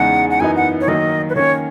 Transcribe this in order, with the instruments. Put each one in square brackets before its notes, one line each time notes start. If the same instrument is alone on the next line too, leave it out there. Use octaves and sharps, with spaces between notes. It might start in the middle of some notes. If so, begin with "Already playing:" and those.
Already playing: [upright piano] E2 C#3 G#3 D#4 [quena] F#5
[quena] F#5
[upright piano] F#2 E3 B3 D#4 [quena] G#5
[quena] F#5
C#5
[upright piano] D#3 F#3 A#3 D#4 [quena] D#5
[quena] B4
[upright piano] D#3 A#3 C#4 [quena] C#5